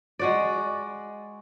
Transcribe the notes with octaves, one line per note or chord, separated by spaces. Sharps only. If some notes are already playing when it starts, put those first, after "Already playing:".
G#3 F#4 D5